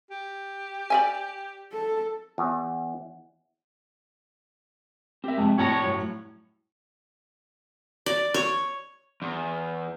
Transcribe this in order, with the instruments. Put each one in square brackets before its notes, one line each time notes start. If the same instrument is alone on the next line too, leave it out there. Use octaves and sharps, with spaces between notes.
[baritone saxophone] G4
[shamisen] D5 E5 G#5
[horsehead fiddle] A4
[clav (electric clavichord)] E2
[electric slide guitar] C4 A#4 [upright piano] G4 E5
[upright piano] F2 C3 [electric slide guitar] G#3 A3
[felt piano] A2 [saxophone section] C#5 [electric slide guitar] D5 A5 A#5
[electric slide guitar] G2 F#3
[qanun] D5
C#5
[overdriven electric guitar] E2